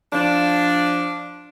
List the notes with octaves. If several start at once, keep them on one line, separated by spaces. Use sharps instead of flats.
F3 D4